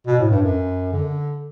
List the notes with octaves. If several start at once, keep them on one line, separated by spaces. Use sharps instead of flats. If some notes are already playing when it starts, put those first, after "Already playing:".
B2
A2
G2
F#2
D3